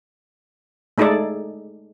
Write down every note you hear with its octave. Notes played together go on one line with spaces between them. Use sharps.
G#3 A3 D#4 G#4 A4 D5